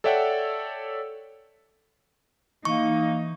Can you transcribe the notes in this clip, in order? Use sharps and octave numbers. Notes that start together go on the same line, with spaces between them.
A4 C#5 D5 E5 F#5 G5
E3 A#3 D#4 C#6